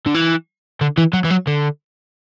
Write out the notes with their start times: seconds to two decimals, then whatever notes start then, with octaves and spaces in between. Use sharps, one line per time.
0.06 D3
0.15 E3
0.81 D3
0.98 E3
1.13 F#3
1.25 E3
1.31 F#3
1.47 D3